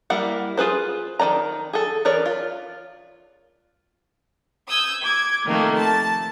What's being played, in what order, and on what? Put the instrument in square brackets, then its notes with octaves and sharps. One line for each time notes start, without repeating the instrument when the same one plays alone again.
[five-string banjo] G3 A#3 E4 F#5
F4 G#4 B4 C5
D#3 D#4 D5 A#5
G#4 A4
E3 A#4 C#5 D5
F4
[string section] D#6 E6 G6 G#6
D6 G#6
C3 D#3 F3 A3 A#3
A5